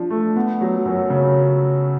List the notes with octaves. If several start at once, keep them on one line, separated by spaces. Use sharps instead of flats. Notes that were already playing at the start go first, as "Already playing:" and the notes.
Already playing: F3 D4
A3
B3
F#3
F#2
C#3